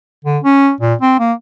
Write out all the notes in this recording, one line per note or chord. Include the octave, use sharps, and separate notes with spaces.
D3
C#4
A#2
C4
A#3